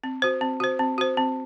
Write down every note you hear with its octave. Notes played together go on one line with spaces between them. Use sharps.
C4
F#4 C5
C4
F#4 C5
C4
F#4 C5
C4